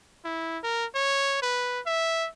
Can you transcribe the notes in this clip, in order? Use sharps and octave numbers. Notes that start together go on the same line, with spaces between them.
E4
A#4
C#5
B4
E5